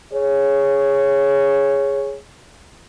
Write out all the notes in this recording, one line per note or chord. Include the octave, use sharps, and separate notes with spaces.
G#4 C#5